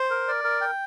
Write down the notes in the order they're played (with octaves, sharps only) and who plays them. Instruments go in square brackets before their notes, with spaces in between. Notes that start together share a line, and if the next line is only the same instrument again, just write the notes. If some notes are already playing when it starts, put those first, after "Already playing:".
Already playing: [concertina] C5
A#4
D5
A#4
G5